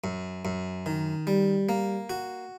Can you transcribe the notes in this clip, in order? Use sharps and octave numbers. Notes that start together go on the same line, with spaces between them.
F#2
F#2
D#3
G3
A#3
F#4